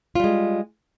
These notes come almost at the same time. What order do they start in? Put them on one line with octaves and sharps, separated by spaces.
F4 G3 G#3